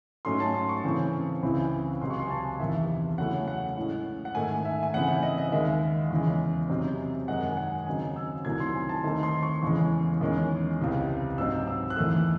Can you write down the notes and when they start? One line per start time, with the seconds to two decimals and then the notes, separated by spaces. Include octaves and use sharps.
0.25 G#2 F#3 A3 C#4 C6
0.40 A5
0.54 C6
0.69 C#6
0.84 C#3 E3 C4
1.42 C#2 C#3 E3 C4 E4
2.01 C#2 C3 F#3 C6
2.11 C#6
2.20 C6
2.27 G#5
2.30 A5
2.60 E2 C3 D#3 E5
3.18 C#3 F#3 A3 C#4 E4 F#5
3.48 F#5
3.77 A2 G#3 C#4
4.25 F#5
4.35 G#2 D#3 A3 G#5
4.65 E5
4.83 G#5
4.94 C#3 E3 C4 E4 F#5
5.08 E5
5.23 D#5
5.38 D#5
5.52 D#2 D#3 G#3 E5
6.11 E2 C#3 G#3
6.70 C3 F#3 C4 D#4
7.28 F#2 D#3 G#3 D#4 F#5
7.53 G#5
7.57 F#5
7.86 D#2 C#3 F#3 C4 D#4 G#5
8.16 E6
8.45 C2 C3 D#3 F#3 A3 G#6
8.60 C6
8.75 G#5
8.89 A5
9.04 D#2 D#3 A3 C4 D#4 C6
9.23 C6
9.43 C#6
9.63 E2 C#3 E3 G#3
10.21 E2 D#3 G#3 C#4
10.79 C#2 C3 E3
11.38 G#2 F#3 C4 D#4 E6
11.68 E6
11.90 F#6
11.96 E2 D#3 A3 E6